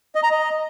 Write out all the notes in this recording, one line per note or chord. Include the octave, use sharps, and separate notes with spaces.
D#5
A#5
D#5